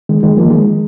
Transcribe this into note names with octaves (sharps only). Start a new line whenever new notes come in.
D#3 G#3
D#3 G#3
F3 A#3
D#3 G#3